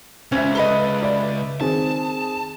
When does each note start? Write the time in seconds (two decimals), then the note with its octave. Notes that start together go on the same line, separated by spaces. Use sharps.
0.32 C#2 C#4 C5 E5
0.55 A4 B4 D#5 G7
1.02 D5 E5 B5
1.61 D#3 C4 G#4 A5